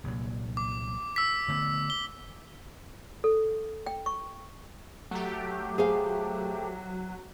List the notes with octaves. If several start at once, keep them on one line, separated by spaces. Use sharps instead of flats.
C2 A#2 F#3
D6
E6 B6
D3 A3 B3
G7
A4
G5
C#6
F#3 A3 G4
G#4 C5 F5